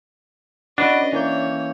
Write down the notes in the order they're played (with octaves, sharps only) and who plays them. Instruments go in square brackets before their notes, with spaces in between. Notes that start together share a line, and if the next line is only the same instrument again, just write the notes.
[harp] C#4 E4 [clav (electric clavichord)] D4 [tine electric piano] F#4 B4 D6 [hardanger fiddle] D#5
[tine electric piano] E3 A#3 G6 [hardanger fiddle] C#5